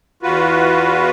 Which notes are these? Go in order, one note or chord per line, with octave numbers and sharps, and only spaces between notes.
E2 F4 F#4 B4